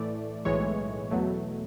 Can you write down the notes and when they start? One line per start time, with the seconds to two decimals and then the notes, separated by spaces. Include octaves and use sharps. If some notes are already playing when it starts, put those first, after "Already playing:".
Already playing: A2 E3 A3 D5
0.45 B1 A2 E3 G#3 C#5
1.11 E2 B2 F#3 A3